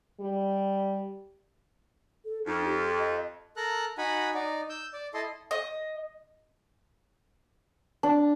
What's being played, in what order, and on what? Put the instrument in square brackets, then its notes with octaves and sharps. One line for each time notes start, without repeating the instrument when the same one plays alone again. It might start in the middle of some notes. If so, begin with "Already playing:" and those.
[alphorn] G3
[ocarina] A4
[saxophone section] F2 [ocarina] D#4
[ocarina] G4
D#5
[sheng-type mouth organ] A4 A#4 A#5 F#6
D#4 F#4 F#5 G#5 B5
D#4 D5
E6 G6
D5
E4 A4 D#5 C6
[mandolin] D#5
[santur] D4